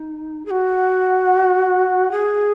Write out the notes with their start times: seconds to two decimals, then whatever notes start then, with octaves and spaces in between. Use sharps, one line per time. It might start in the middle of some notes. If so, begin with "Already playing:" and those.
Already playing: D#4
0.46 G#4
0.51 F#4
2.12 G#4